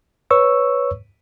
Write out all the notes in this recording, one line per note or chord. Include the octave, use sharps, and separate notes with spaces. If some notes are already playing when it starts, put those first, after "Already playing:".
B4 C#5 C#6 E6